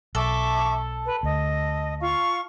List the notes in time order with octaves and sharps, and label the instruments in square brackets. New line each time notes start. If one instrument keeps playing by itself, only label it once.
[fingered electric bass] B1 [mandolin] A4 [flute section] E5 C#6 D6
[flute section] B4
[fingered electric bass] D2 [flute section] D#5
[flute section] F4 F5 C#6